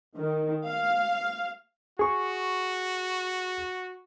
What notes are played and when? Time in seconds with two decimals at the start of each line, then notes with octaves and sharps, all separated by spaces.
0.17 D#3
0.66 F5
1.99 F#4 G#4 C#6